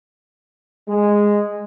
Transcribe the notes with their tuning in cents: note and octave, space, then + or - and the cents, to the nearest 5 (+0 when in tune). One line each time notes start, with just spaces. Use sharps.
G#3 -10